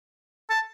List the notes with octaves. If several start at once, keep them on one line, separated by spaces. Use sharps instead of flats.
A5